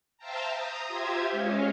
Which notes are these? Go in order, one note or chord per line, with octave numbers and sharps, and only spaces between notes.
C5 E5 F5 G5 A5 A#5
A#5 D#6
F4 G4 C5 E5 G#6
G#3 C#4 C#5 D#5 F5